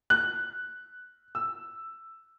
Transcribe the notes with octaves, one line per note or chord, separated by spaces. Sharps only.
F#6
E6